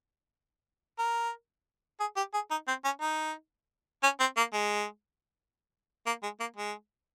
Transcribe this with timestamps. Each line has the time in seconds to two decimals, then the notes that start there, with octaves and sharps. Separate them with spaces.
0.99 A#4
2.00 G#4
2.17 G4
2.34 G#4
2.51 D#4
2.68 C4
2.85 C#4
3.01 D#4
4.03 C#4
4.20 C4
4.37 A#3
4.53 G#3
6.06 A#3
6.23 G#3
6.40 A#3
6.56 G#3